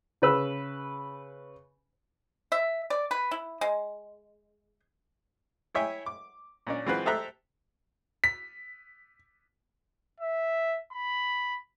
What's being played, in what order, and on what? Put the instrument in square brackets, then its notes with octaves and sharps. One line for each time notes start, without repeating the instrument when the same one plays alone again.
[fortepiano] C#3 B4 E6
[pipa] E5
D5
B4
E4
G#3
[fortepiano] E4 C#5 E5 G5 G#5
D6
A#2 C#4 D4
E3 G#3 C4 F4 F#4 B4
G4 A4 C5 E5 A#5 F#6
[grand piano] B6
[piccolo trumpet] E5
B5